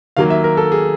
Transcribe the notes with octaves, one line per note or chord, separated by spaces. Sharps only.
D#3 F#3 A#3 F5
E5
A#4
A4
G#4